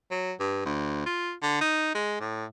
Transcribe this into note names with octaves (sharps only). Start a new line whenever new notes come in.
F#3
G2
D2
F4
D3
D#4
G#3
A2